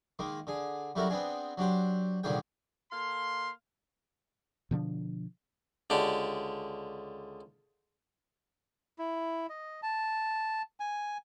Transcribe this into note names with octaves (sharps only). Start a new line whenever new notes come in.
D#3 G#3 A#3
D3 G#4
F#2 G3 E4 F#4 A4 A#4
B3 C4 D4 G#4
F#3 D4 G4 C5
C2 A#2 D3 D#3 G#4 G5
A#3 A4 F5 C6
B2 D3 F3 D4
C#2 D3 D4 G4
E4
D#5
A5
G#5